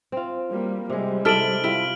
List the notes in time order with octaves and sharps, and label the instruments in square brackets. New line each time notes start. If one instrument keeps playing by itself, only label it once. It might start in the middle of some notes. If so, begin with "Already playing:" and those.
[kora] C4 F4
[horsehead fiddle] G3 A#3
[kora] C3 G#3 [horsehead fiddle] G3
[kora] C3 [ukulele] E4 A4 [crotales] F6 D7 F#7
[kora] G3 F4 [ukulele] E4